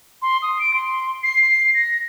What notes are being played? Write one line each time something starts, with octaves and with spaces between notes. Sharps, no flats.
C6
D#6
D7
C6
C7
A#6